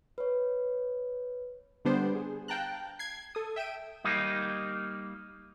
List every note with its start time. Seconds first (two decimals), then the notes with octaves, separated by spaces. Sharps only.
0.18 B4 C#5
1.85 D3 G3 B3 D4 C5
2.15 G#4
2.48 F5 G5 A5 A#5 F#6
2.99 G#6 C7
3.35 A4 D#6
3.56 E5 G5 E6 D7 D#7
4.04 G3 A#3 D#4